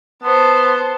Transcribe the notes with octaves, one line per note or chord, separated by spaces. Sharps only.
B3 C5 A5